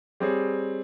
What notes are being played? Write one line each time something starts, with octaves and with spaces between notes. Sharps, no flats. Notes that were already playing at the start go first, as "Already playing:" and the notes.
G3 C4 G#4 C#5